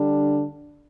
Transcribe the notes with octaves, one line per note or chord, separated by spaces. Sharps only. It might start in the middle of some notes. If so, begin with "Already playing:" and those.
Already playing: D3 G3 D4